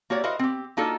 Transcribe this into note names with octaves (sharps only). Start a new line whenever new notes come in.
A#3 F#4 G4 C#5 D5
E4 F#4 A#4 C5 D#5 F5
C4 G4
A#3 D4 D#4 F4 F#4 A4